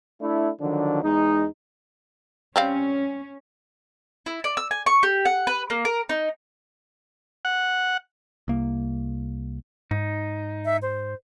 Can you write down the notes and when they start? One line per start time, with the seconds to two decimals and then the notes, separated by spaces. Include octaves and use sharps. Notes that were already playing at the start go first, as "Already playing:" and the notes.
0.21 A3 D4 E4
0.61 D3 D#3 F3 F#3 D4
1.03 E2 G#3 D#4
2.56 G3 C4 C#4 F5
4.26 E4
4.44 D5
4.57 E6
4.71 G#5
4.86 C#6
5.03 G4
5.25 F#5
5.47 B4
5.70 A#3
5.85 A#4
6.09 D#4
7.45 F#5
8.48 C2 A#3
9.91 G#2 D#4
10.65 E5
10.82 C5